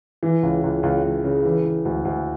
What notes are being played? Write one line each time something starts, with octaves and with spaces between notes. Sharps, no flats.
E3
C#2
C#2
C#2
C#2
C#3
E3
E3
D2
D2